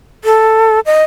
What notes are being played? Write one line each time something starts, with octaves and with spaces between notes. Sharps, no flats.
A4
D#5